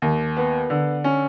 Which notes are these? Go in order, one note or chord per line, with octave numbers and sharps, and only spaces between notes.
D#2
B3
D3
C#4